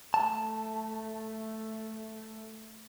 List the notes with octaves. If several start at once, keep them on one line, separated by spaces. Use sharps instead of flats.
A3 A5